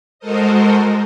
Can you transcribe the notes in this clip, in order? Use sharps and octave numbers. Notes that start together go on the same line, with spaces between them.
G#3 F#4 A4 A#4 C5 D#5